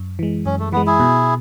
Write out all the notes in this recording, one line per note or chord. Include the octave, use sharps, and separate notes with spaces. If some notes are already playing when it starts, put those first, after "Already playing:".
Already playing: F#2
E3 G#3
F#2 C#4
A3
E3 G#3 B3
E4 G#4
B2